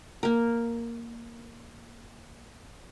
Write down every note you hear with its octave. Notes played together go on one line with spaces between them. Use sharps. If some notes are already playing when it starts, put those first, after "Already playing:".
A#3 A#4